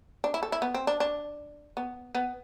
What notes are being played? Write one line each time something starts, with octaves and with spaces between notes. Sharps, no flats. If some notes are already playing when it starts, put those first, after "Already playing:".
D4
E4
A4
E4
B3
C4
D4
D4
B3
B3